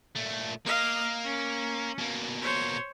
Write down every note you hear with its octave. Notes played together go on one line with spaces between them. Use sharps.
A#2 A3
A#3 D#5 F5
C#4
B2 A#3
C5 C#5